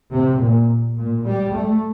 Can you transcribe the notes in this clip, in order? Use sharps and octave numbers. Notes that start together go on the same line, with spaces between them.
C3
A#2
A#2
G3
A3